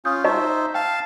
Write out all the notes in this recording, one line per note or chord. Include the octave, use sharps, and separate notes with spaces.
C#4 F4 D#6 G6
D#4 C5 D#5 E5 A5 A#5 C#6
F5 G5 A5